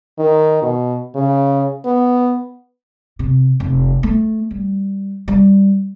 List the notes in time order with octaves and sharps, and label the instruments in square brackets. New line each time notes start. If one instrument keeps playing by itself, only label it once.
[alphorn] D#3
B2
C#3
B3
[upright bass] C3
F1
A3
G3
G3